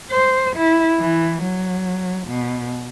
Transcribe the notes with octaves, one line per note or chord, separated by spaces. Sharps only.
C5
E4
E3
F#3
B2